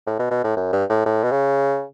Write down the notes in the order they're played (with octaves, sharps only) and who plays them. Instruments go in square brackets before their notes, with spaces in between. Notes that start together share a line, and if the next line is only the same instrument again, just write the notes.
[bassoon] A2
B2
B2
A2
F#2
G2
A2
A2
B2
C#3